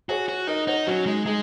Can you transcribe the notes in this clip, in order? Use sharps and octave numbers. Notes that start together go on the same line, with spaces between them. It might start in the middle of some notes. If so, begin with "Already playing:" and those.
F#4 G#4 C#5
F#4
D#4 A#4 D#5
D#4 C#5 F#5
F#3 C#4 F#4
G#3 D#4
G#3 D#4 G#4